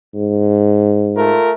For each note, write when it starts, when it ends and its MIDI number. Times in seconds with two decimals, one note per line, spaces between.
0.15 1.35 44
1.15 1.51 57
1.15 1.51 65
1.15 1.51 70